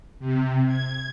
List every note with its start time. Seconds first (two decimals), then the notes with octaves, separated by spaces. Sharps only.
0.20 C3
0.66 G#6